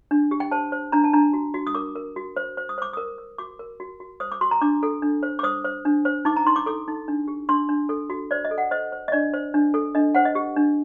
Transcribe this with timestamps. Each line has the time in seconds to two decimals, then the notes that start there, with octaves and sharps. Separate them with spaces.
0.11 D4
0.31 G4
0.40 G5
0.51 C5 A5
0.72 C5
0.92 D4 A#5
1.04 A5
1.13 D4 A#5
1.33 F#4
1.54 F#4
1.67 D#6
1.75 A#4 D6
1.95 A#4
2.16 F#4
2.37 C5
2.57 C5
2.69 D#6
2.78 C5 D6
2.93 A#4 D#6
3.18 A#4
3.38 F#4 D6
3.59 A#4
3.80 F#4
4.00 F#4
4.20 C5 D#6
4.32 D6
4.41 F#4 C6
4.51 A#5
4.61 D4 D6
4.83 A4
5.02 D4
5.23 C5
5.39 D6
5.43 C5 D#6
5.65 C5
5.85 D4
6.05 C5
6.25 D#4 D6
6.36 A#5
6.47 D#4 C6
6.56 D6
6.66 A4 D6
6.88 D#4
7.08 D4
7.28 G4
7.49 D4 C6
7.69 D4
7.89 A4
8.10 F#4
8.31 C5 D5
8.45 D#5
8.51 A4
8.58 F#5
8.71 C5 D#5
8.92 C5
9.08 D#5
9.12 D4 D5
9.34 C5
9.54 D4
9.74 A4
9.95 D4 D#5
10.15 C5 F#5
10.25 D#5
10.35 G4
10.57 D4